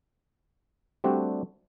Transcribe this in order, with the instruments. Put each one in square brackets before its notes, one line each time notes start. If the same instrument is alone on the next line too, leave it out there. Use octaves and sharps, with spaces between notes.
[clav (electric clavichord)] G3 A3 C4 D4 F#4 G4